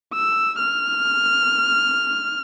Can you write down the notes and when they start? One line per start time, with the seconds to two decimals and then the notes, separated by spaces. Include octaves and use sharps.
0.14 E6
0.59 F6